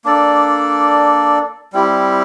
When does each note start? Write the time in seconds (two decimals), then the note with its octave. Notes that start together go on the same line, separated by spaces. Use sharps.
0.04 A#3 D4 A4 D5
1.73 G3 C4 E4 G4